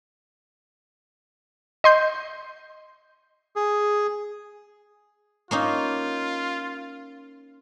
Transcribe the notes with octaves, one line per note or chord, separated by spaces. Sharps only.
D#5 C6 G6
G#4
A#3 C#4 D#4 F4